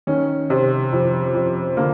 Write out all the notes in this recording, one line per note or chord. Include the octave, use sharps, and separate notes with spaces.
D#3 C#4
C3
F2
F2
D3 A#3